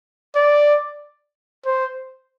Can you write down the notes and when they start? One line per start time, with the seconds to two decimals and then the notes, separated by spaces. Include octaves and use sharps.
0.35 D5
1.66 C5